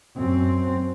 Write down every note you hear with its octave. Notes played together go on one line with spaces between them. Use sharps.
F#2 C4